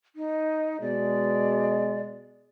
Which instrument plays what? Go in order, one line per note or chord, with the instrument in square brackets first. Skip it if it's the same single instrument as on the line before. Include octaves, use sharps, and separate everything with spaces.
[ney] D#4
[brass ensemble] B2 G#3 [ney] D5